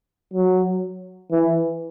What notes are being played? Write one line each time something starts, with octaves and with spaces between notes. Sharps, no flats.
F#3
E3